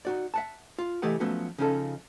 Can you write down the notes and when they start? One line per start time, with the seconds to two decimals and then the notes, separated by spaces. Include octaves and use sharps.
0.05 D#4 F#4 D5
0.34 E5 F#5 A5
0.79 F4
1.02 C2 E3 A3 G4 D#5 F#5
1.20 F3 F#3 A3 B3 C#4 F#4
1.58 C#3 F3 C#4 D#4 G#4 A4